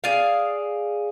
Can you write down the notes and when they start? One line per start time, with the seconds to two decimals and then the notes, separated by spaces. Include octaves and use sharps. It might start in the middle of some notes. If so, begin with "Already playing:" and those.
0.04 G#4 D5 F5